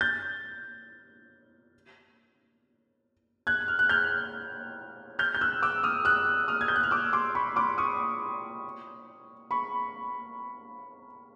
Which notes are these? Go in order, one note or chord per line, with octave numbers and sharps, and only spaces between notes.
G6 A6
F#6 G#6
F6
F#6
F6 G6
F6 G6
G6
E6 F#6
D6 E6
D#6 F6
E6 F#6
D#6 F6
G#6
G6
F#6
F6
D6 E6
C6 D6
B5 C#6
C6 D6
C#6 D#6
B5 C#6